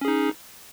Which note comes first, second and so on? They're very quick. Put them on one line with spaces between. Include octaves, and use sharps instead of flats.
C#4 G#4 D#4